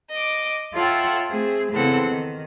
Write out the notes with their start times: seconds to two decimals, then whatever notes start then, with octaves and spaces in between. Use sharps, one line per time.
0.12 D#5 D6
0.73 F4 A4 C#5 E5 F#5 G5
1.29 A3 C4 G#4
1.71 E2 C#3 C4 A4 F#5
2.06 D#3